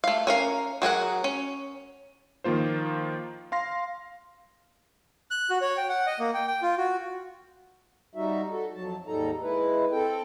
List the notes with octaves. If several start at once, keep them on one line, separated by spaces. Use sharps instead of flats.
A3 F5
C#4 A#4 F5
F#3 G#4 A#4 F#5
C#4
D#3 F3 A#3 F4 C5
F5 C6 A#6
F#6
F#4
C#5
G5
F#5
D#5
A#3
G5
G5
F4
F#4
G3 D#4 F#4 E5
F#4 A4
F2 F#3 A5
D#2 G#2 G3 D#4 A4 A#5
G#3 E4 B4
C4 A4 G5